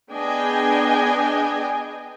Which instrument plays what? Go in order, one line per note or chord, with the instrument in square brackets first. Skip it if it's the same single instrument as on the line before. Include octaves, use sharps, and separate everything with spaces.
[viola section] B3 D4 G#4 D#5 G5 G#5